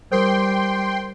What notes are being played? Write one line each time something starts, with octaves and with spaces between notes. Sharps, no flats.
G3 A#4 C5 G5 C6